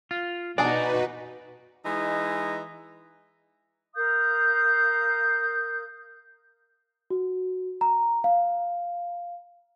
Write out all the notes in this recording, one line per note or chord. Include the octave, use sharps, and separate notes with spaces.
F4
B2 D4 D#4 F#4 G#4 B4 D5 A5
E3 G#3 D#4
A#4 F5 D#6 G6
F#4
A#5
F5